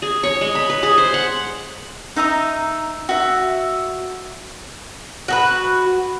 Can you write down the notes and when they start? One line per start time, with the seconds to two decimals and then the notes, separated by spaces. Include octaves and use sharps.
0.02 G#4
0.23 C#5
0.41 G#3
0.55 B5
0.70 B4
0.83 G#4
0.98 C5
1.14 F#5
2.16 D#4 E5 A#5 D#6
3.09 F#4 E5
5.28 F#4 G#4 B4